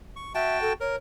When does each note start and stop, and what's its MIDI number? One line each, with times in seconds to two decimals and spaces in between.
0.16 0.33 85
0.35 0.73 66
0.35 0.60 76
0.35 0.73 79
0.35 0.73 81
0.62 0.73 69
0.80 0.96 70
0.80 0.97 73